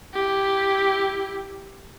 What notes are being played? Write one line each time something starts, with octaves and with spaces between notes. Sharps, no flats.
E4 G4